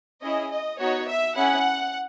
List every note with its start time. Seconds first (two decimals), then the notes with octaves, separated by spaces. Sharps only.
0.22 C#4 E4 G#4 D#5
0.50 D#5
0.78 B3 D#4 F#4 C#5
1.06 E5
1.35 C#4 E4 G#4 F#5